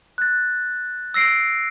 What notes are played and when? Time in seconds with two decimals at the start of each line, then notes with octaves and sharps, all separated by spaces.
0.18 F#6 A6
1.14 E6 A#6 C7 D7